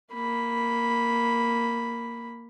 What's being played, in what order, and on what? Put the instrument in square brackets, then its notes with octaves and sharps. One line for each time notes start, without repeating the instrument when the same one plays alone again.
[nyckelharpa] A#3 B5